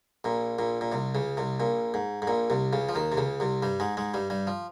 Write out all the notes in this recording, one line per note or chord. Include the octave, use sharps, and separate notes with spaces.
A#1 A#2
A#1 A#2
A#2
C2 C3
C#2 C#3
C2 C3
A#1 A#2
G#2
G#2
A#1 A#2
C2 C3
C#2 C#3
F3
D#2 D#3
C3
C#2 C#3
C2 C3
G2 G3
G#2 G#3
G#2 G#3
G2 G3
G2 G3
F3